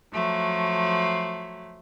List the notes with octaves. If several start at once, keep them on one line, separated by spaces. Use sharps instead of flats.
F3 F#3 A3